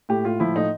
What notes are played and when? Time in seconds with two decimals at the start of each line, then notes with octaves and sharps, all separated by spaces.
0.09 A2 G4
0.25 A2 F4
0.40 F3 E4
0.56 A2 D#4